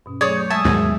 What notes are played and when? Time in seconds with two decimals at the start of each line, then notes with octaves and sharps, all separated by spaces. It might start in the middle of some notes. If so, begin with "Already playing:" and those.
0.06 G2 B2 C#4
0.21 F#3 A3 G#4 C#5 D5
0.37 G6
0.50 G#3 E5 G#5 A5 D#6
0.65 D#2 G#2 B2 F#3 B3 G#4